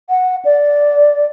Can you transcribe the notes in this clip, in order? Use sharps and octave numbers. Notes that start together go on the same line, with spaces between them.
F#5
D5